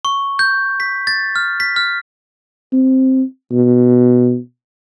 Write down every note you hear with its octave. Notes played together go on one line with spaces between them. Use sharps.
C#6
G6
B6
A6
F6
B6
F6
C4
B2